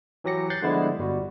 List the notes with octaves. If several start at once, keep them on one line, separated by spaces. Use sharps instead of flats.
E3 F#3 G4 A#6 C#7
F#6 G6 A6 C7
D3 F3 G3 G#3 B3 E4
G1 G3 F#4